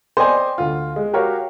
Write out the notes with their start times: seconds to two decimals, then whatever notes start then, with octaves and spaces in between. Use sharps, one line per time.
0.17 C5 D5 D#5 G5 G#5
0.58 D2 F4
0.96 G#3
1.13 F#4 G4 A#4 C#5 F5